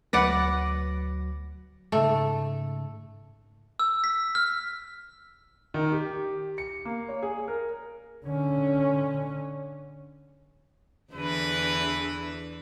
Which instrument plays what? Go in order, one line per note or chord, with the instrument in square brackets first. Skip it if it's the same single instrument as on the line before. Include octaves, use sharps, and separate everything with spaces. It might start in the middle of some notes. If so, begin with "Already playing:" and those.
[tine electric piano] D2 F#3 A#6 [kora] B4 D5 F#5
[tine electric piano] G#2 C#3 [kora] A3
[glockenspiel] E6
B6
F6
[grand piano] D#3
G4
C#7
A#3
C#5
G#4
A#4
[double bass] D3 C#4
[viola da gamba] E2 D3 E3 [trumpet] B4